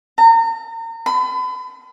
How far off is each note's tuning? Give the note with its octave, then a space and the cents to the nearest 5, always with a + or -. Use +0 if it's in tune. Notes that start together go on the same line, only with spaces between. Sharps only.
A#5 -35
B5 +40